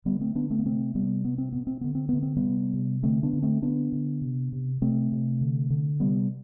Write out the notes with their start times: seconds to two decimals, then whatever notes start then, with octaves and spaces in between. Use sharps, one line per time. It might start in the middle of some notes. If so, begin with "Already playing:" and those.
0.05 D3 G3 B3
0.20 A3 C4
0.35 D3 B3 D4
0.50 A3 C4
0.59 B3
0.65 C3 A3 C4
0.95 C3 G3 B3
1.25 B2 B3
1.38 C4
1.52 B2 B3
1.67 C4
1.81 D3 B3
1.95 C4
2.09 D3 B3
2.22 C4
2.37 G3 B3
2.44 C3
2.74 C3
3.03 D3 A3 C4
3.23 B3 D4
3.33 D3
3.42 A3 C4
3.62 D3 B3 D4
3.92 D3
4.21 C3
4.52 C3
4.82 C3 A3 C4
5.12 C3
5.41 D3
5.70 D3
6.00 C3 G3 B3